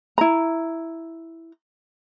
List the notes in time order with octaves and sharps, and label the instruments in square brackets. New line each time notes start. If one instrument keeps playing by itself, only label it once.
[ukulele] E4 A#5